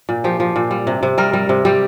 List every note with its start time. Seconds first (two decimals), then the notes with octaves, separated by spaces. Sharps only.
0.09 A#2
0.24 F3 G4
0.40 F3
0.56 A#2
0.71 G3
0.87 C3
1.03 C3
1.18 G3 A#4
1.33 G3
1.49 C3
1.65 G3 G4